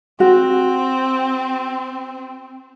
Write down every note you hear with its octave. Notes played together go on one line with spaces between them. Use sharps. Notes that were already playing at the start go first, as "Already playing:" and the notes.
C4 F#4